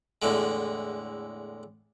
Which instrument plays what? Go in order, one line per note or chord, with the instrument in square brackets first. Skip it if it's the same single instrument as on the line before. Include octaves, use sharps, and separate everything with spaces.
[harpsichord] E2 A2 D3 G#3